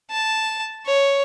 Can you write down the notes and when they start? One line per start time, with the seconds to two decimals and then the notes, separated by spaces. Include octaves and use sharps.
0.11 A5
0.86 C#5